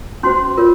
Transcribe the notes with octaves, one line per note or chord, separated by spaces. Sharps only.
C#4 F#4 C5 C6
F4 A#4 C#5